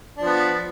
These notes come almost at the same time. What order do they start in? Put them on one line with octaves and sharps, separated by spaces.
D4 F3 B3